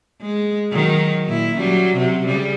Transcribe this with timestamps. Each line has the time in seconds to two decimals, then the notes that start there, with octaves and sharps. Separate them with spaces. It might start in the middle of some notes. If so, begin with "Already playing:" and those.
0.22 G#3
0.70 D#3 F#3
1.27 A#2 E4
1.57 F#3 G3 C#4
1.98 C3 F#3
2.26 C#3 G3